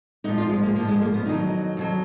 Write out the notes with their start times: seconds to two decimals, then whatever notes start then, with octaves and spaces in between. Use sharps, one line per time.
0.24 G#2 F3 D#4
0.38 F4
0.50 G#3
0.63 A#3
0.76 G#2 F3 A#3
0.88 G#3
1.01 A#3
1.14 B3
1.26 F2 D#3 F#3 D#4
1.77 F2 D#3 F#3